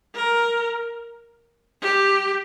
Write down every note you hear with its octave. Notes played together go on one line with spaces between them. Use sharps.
A#4
G4